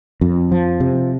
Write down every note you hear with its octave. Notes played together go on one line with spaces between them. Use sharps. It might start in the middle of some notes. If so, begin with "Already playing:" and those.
F2
F3
C3